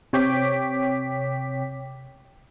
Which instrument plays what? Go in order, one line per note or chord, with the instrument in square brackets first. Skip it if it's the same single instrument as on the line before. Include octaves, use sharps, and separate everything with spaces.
[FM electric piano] C3 C#5 G5 D6 B6